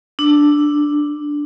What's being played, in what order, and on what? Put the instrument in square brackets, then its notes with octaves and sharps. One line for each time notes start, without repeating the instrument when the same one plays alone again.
[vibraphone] D4